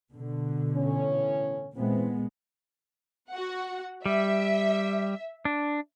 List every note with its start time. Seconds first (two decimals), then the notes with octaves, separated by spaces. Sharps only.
0.12 B2 D3
0.76 A2 E3 C#4
1.76 A#2 E3 G#3 B3 C4
3.30 F#4 F#5
4.06 G3 E5
5.45 D4